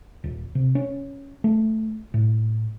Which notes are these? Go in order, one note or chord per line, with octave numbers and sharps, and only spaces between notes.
D#1
C3
C#4
A3
A2